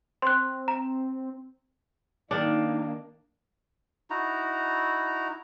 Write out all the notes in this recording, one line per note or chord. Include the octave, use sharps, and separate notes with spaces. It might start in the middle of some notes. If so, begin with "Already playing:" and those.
C4 C6 F#6
A#5
D#3 A#3 D4 D#4
D#4 E4 F#4 A#5